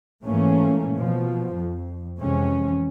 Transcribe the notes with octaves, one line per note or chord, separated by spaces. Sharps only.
G#2 E3 A3 A#3 C#4
B2 F3
F2
F2 C3 E3 G#3 C#4